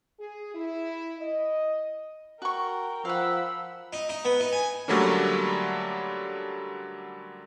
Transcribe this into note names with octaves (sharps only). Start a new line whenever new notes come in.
G#4
E4
D#5
F#4 A#4 G5 C#6
F3 F5 F#5 B5 E6
D#4
D#4
B3
D#4
G#5
D3 F#3 G3 A3 A#3 C#4